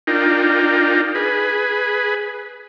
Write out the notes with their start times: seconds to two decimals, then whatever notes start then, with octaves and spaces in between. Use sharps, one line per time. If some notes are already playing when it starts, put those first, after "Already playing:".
0.07 D4 D#4 F4 A#4 G5
1.15 G#4 B4